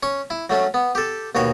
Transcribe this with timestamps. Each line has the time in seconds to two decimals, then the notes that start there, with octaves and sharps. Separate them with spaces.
0.03 C#4 C#6
0.30 E4
0.50 F#3 A3 C#4
0.74 B3
0.95 G4 A4
1.35 D#2 B2 F#4 C#5